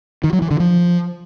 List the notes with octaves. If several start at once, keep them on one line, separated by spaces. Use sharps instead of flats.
D#3
F#3
E3
D3
F3